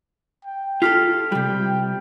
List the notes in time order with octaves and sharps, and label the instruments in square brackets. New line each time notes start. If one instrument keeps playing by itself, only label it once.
[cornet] G5
[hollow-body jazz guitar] F4 G4 A4 [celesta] F6 B6 C7
[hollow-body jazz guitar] C3 G3 [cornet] G5